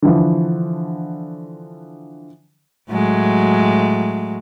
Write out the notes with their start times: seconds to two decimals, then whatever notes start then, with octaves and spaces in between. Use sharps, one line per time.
0.02 D3 E3 F3
2.89 A2 F#3 G#3